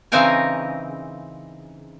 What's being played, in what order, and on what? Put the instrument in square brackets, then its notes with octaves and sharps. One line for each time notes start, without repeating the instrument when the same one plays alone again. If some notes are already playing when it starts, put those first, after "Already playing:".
[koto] C#3 E3 C4 D#4 A#4 G#5